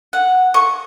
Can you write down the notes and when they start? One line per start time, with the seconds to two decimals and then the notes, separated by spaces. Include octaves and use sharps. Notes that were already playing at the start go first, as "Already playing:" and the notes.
0.13 F#5
0.54 C#6